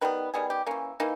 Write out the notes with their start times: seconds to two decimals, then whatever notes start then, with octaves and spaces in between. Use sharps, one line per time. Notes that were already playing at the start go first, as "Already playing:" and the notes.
0.01 D#3 G3 B3 B4
0.34 D#3 G3 B3 G#4
0.50 G4
0.66 E3 A#3 C#4
1.00 E3 A#3 D#4